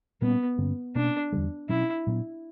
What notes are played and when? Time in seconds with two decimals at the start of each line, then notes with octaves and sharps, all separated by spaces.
0.22 A#2 G3 A#3 B3 C#4
0.58 G2 D3 A#3 C#4
0.95 B2 A#3 C#4 D4
1.32 E2 D3 G3
1.69 B2 F#3 C#4 E4
2.07 A#2 F#3 B3 D4